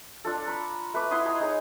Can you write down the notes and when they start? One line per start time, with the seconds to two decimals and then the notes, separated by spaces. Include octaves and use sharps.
0.25 D4 F4 A4
0.47 A#5 B5 C#6
0.94 A3 B4 B5 D6
1.11 E4 F#5 C6 D#6
1.25 D#5 G#5 A#5 C6
1.40 D#4 G#4 C#5 A#5